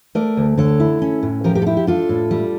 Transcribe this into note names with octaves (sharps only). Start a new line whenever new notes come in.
A3 A#4 D5
D2
D3 A4 C#5
E4
C#4
A2
F3 G4 A#4
G4 A#4
A4
E4 G4
G4
D4 F4 A4
A2
G3